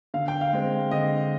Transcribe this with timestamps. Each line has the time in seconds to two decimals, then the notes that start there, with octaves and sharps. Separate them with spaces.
0.14 D3 F5
0.28 G5
0.41 F5
0.53 G#3 C4
0.91 D3 D#5